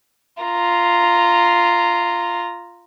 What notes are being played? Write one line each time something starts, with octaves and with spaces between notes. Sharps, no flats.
F4 A#5